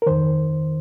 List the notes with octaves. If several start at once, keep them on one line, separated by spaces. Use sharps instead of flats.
A#4
F2 D#3 C5